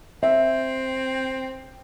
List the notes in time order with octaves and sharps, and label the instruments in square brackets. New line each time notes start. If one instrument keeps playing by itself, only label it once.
[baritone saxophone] C4 [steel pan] E5